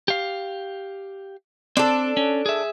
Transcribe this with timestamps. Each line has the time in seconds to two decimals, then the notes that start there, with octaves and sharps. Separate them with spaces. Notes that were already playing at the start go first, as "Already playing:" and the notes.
0.08 G4 F5
1.77 C4 D4 A4
2.17 C#4
2.46 G#4 E5